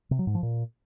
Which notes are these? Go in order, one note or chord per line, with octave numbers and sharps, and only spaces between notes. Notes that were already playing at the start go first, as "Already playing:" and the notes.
C3
F#3
G#2
F3
A#2